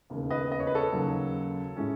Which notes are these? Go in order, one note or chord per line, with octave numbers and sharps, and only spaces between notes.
E1 D#2 C#3
B4 D#5
D#5
C#5
B4
A4 C#5
D#2 C#3 F#3
A2 G#3 C#4